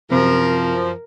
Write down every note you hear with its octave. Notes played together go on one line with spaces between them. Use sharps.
F#2 C3 F3 A#4